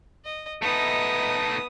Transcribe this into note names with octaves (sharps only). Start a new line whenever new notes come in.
D#5
A3 B3 D#4 D#6